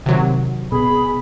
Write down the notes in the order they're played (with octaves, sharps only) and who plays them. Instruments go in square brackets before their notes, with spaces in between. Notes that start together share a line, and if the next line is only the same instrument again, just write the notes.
[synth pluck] C3 F#3 [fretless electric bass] D#3
[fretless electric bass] B2 [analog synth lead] G#4 [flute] B5